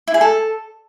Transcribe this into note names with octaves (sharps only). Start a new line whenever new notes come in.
E4
G#4
A4